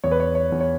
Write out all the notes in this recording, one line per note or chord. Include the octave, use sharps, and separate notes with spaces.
E2 C#5
B4
C#5
C#5
E2
C#5